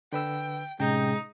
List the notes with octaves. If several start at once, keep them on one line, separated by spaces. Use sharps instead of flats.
D3 B4 G5 E6
A2 C3 G#3 C#4 D#4 G5 G6